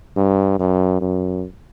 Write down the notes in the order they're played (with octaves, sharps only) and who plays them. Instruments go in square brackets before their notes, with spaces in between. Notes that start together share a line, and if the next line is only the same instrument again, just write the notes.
[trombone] G2
F#2
F#2